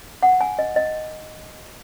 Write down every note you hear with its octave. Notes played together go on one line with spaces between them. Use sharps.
F#5
G#5
D#5
D#5